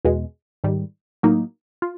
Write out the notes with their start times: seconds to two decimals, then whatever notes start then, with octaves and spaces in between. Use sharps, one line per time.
0.05 E2 B2 G#3
0.64 G#2 D#3 G3
1.23 A2 F#3 A#3 D#4
1.82 F4